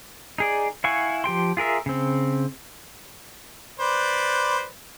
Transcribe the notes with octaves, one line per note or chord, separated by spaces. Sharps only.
D#4 G#4 D5
E4 F5 F#5 G#5 C#6
F3 G4 G5 C6
F4 G#4 A#4 E5
C#3 C4
B4 C5 D5